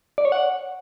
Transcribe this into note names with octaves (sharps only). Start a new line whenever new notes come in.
D5
C#5
F#5